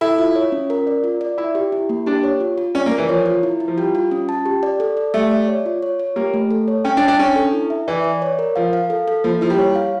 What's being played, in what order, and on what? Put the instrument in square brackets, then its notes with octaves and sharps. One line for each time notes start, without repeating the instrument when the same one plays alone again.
[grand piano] E4 [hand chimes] A4
[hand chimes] F4
C#5
C#4
A#4
D5
F4
D5
[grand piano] E4 [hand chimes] E5
[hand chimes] G4
E4
A#3
[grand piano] D4 [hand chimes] G4
[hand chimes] C#5
F4
F4
[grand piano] C#4 [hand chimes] D5
[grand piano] A#3
[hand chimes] A#4
[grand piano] E3
[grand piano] F3 [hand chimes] C#5
[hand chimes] F4
E4
E4
[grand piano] F3
[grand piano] G3 [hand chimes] F4
[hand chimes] F4
C#4
A5
G4
D5
A4
D5
[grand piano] A3 [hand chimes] G4
[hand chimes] D5
C#5
F4
C#5
C#5
[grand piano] A#3 [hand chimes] G4
[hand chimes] A3
A4
C#5
[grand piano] C#4 [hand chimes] G5
[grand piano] D4
[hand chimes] G5
[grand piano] D4
[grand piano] C#4 [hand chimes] D4
[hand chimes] A4
E4
E5
[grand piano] E3 [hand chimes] D5
[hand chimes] D5
C#5
A#4
[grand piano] F3 [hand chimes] F5
[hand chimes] F5
A4
A4
[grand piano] F3 [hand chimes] A#3
[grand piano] F3 [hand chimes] E4
[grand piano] G3
[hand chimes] C#5
F5